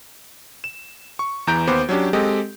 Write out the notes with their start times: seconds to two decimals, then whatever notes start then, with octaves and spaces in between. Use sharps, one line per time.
0.64 E7
1.19 C#6
1.47 E2 E3 A#5 G6 D7
1.67 D#2 B3 C5 B5 D6
1.89 F#3 C#4 D4 G4
2.13 G#3 C4 G4 A4 D#5